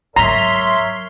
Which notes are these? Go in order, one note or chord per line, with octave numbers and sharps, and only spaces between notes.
G#2 F#3 A#4 C#5 E5 A#5 C6 B6